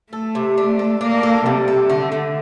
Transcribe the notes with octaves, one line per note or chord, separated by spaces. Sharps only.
A3 A4
C3
D4
A4
A#3 D4
A4
C3 G3
A4
D3 A3
A3